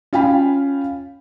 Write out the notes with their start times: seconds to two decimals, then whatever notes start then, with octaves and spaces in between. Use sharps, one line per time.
0.13 C#4 F4 F5 G5 G#5 B5